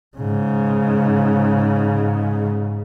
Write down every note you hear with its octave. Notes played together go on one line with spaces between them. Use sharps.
G#2 C#3